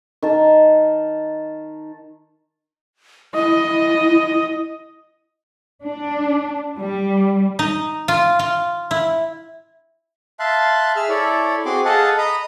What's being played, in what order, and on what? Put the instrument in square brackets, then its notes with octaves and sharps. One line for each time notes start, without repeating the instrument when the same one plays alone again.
[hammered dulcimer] D#3 A5
[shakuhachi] E4 [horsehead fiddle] D#5
[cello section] D4
G3
[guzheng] D#4
F4
F4
E4
[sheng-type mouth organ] E5 F5 A5 C6 F#6
G#4 E5 E6 F6
E4 A4 C#5 D5
C4 F#4 G#4 C6 D6
G#4 A4 D#5 F5 F#5 A5
D#5 A#5 B5 D#6